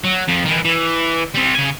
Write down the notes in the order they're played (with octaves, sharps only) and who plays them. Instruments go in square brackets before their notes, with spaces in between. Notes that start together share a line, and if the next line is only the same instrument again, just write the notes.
[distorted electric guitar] F#3
F2 F3
D#3 E3
E3
G3 C4
C#3 G#5